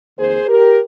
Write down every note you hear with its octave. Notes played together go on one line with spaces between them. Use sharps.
F2 D#3 A#3 G#4 C5
G4 A#4